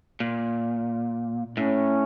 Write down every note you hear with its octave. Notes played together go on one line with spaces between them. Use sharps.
A#2
A2 C#4